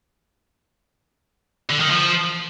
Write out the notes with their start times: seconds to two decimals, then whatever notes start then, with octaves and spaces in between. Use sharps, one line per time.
1.70 D3
1.80 D#3
1.89 F3